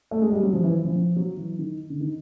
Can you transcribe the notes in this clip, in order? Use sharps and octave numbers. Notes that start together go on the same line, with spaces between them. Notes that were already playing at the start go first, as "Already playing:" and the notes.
A3
G#3
G3
F#3
F3
E3
F3
F3
F#3
E3
D#3
D3
D#3